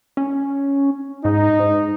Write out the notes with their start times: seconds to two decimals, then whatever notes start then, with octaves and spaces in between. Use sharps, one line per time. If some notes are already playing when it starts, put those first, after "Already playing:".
0.17 C#4
1.25 G#2 D#4
1.60 G#2